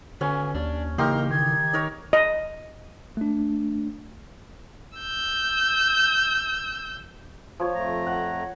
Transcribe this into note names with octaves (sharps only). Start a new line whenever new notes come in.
D3 C#4 F#4 B4 G#5
D#2 D4
C#3 E3 A#3 D#4 G4 A#4 C6
D#3 G#6
D#4 A#4 C#5
D#5
A3 D4
E6 G6
F3 C#5
F2 A3 A#5
F#5